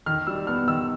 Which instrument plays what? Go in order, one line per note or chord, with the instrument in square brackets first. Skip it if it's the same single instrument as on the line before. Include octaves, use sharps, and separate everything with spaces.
[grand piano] D#3 F6
G3 E6
B3 F6
D#3 E6